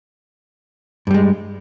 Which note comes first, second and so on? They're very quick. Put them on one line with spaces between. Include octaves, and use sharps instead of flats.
G2 G3 G#3